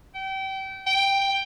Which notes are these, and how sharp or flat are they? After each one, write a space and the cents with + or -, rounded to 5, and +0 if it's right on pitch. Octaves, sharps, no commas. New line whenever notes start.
G5 -30
G5 +5